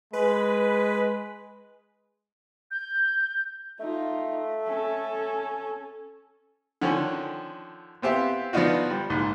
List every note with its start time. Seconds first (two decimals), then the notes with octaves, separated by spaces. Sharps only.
0.13 G#3 B4
2.71 G6
3.80 A3 D#4 F4
4.65 C#4 A4
6.81 D3 D#3 F3 C#4
8.02 B3 C4 G4 E5 F5
8.53 F3 B3 D4 D#4 F4 F#4
8.90 G3
9.10 A#1 G#2